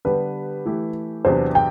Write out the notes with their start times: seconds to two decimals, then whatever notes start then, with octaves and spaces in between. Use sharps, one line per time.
0.05 D3 G3 B3 D4 G4 B4
0.65 E3 A3 E4 G4
1.25 E2 C3 F#3 B3 D4 C5
1.55 G5